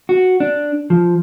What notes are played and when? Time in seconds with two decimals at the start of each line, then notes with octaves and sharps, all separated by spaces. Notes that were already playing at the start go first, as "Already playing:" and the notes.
0.09 F#4
0.40 D4
0.90 F3